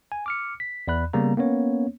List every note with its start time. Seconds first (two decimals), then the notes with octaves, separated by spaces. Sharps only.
0.12 G#5
0.26 D6 F6 C#7
0.60 B6
0.88 E2 D5 B5 F#6
1.13 C#3 G3 A#3 B3 A#5
1.37 A#3 B3 C#4 C#5